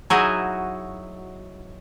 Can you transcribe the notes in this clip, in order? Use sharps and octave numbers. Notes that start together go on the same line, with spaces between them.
F#3 D#4 E4 F#4 G#4 D#5